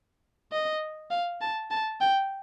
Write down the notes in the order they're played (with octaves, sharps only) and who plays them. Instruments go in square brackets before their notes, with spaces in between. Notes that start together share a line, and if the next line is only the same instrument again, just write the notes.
[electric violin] D#5
F5
A5
A5
G5